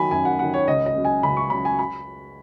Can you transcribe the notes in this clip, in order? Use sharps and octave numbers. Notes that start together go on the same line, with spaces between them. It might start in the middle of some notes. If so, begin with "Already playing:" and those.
Already playing: D#3 F#3 G#5 B5
F#2 G#5
F#5
D#3 F#3 F#5
C#5
C#2 D#5
D#5
C#3 F#3
G#5
C#2 B5
C#6
C#3 F#3 B5
G#5
B5